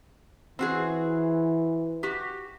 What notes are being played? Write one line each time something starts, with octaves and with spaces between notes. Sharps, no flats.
E3 C4 F#4 G#4
F#4 G4